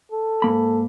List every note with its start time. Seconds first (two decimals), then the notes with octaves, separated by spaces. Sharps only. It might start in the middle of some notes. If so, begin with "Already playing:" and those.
0.12 A4
0.42 G#2 A#3 B5